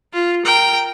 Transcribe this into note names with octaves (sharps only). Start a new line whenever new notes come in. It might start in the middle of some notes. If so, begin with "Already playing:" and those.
F4
A#4 G5